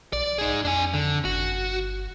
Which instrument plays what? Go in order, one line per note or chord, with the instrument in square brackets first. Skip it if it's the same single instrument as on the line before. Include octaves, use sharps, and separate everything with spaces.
[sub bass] A#1 [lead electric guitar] D5
[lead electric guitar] D#4 G#4
[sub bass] F2 [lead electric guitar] D4 G#5
[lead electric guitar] D3
[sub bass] G1 [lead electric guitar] F#4